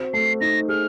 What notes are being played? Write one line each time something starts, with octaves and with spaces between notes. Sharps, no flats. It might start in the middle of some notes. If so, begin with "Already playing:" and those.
Already playing: C4 F#4
A3 C7
D#4 A#6
G#4 F6